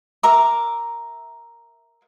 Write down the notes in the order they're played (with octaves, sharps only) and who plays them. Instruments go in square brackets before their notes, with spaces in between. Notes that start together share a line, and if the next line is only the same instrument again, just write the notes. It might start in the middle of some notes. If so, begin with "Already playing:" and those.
[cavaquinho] A#4 E5 A#5 D6